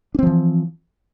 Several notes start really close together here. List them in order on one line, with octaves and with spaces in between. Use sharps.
D4 C4 F3 E3